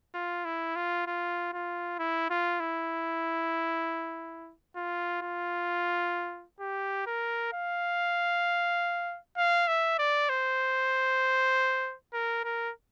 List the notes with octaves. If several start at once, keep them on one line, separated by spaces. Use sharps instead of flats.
F4
E4
F4
F4
F4
E4
F4
E4
F4
F4
G4
A#4
F5
F5
E5
D5
C5
A#4
A#4